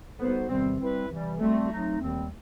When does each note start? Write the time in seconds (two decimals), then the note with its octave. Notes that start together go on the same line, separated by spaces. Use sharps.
0.18 G3 B3 D#4 F#4 A4 C5
0.49 E2 C3 D#3 G3 C4
0.80 G3 C4 E4 B4
1.09 C3 E3 G3
1.40 G3 A3 C4 F#4
1.70 F#3 A3 C4 D#4
2.00 D#2 D#3 G3 C4